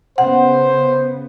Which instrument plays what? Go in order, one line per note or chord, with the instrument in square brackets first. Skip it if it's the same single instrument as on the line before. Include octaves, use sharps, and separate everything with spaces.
[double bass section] C#3 B3 [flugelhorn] C5 [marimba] F#5